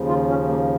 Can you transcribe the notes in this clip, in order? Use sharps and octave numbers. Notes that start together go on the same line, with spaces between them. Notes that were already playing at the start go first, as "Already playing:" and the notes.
Already playing: D#2 C#3 F3
F4
C#4
A#3